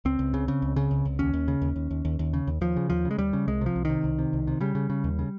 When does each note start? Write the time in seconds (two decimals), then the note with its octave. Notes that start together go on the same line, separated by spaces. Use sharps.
0.05 C#2 C4
0.19 C#2
0.34 C#3
0.48 C#3
0.62 C#2
0.76 C#3
0.91 C#2
1.05 C#2
1.19 D#2 C#4
1.33 D#2
1.48 C#3
1.62 D#2
1.76 D#2
1.91 D#2
2.05 D#2
2.19 D#2
2.33 C#3
2.47 D#2
2.61 D#2 F3
2.76 C#3
2.90 D#2 F3
3.05 C#3
3.11 G#3
3.18 D#2 G3
3.33 C#3
3.48 C2 G#3
3.61 C3 F3
3.76 C2
3.85 C3 D#3
4.04 C2
4.19 C3
4.33 C2
4.47 C3
4.61 C#3 G3
4.75 C#3
4.90 C#3
5.04 D#2
5.19 C#3